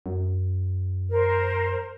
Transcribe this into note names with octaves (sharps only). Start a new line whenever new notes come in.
F#2
A#4 C5